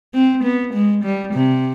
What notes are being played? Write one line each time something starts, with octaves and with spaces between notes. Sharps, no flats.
C4
B3
G#3
G3
C3